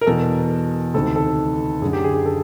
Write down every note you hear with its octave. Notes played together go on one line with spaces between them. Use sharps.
A#4
E2 B2 A4
D2 C3 D#3 A4
A4
F#2 D3 G#4
G4
G#4
G#4
A4